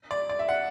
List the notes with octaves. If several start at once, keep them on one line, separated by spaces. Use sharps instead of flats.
D5
D5
E5
F#5